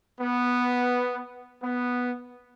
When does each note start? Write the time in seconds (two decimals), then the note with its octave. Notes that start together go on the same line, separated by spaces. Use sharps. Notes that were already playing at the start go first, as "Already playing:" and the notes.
0.20 B3
1.61 B3